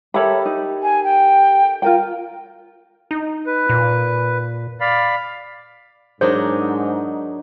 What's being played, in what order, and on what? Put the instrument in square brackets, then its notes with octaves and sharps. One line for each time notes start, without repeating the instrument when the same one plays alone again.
[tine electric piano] G4 A4 A#4 [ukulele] C#5 E5 B5
[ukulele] D#4
[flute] G#5
G5
[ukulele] F4 A#4 G5
[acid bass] D#4
[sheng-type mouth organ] B4
[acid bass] A#2
[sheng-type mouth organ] D5 F5 B5
[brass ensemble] G#2 [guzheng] F#3 D4 D#4 [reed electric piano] G#4 A#4 D#5 [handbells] C5